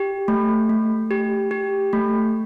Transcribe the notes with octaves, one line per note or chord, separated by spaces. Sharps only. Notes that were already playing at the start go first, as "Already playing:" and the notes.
Already playing: G4
A3
A3
G4
G4
A3